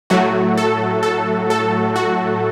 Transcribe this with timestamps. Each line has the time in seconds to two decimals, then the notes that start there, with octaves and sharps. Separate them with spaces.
0.10 A2 F#3 A3 F#4
0.57 A4
1.03 A4
1.50 A4
1.96 F#4